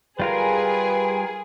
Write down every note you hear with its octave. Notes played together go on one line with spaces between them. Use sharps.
G3 F4 G#4 A#4 B4